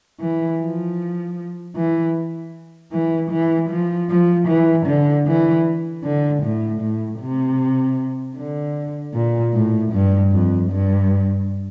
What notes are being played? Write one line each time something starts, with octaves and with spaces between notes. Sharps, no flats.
E3
F3
E3
E3
E3
F3
F3
E3
D3
E3
D3
A2
A2
C3
D3
A#2
A2
G2
F2
G2